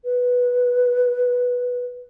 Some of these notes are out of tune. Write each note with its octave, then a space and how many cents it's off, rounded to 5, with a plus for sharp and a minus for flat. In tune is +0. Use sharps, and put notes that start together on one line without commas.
B4 -5